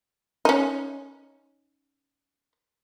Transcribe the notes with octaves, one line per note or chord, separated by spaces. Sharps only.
C#4 D#4